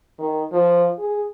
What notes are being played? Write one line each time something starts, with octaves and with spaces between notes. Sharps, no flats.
D#3
F3
G#4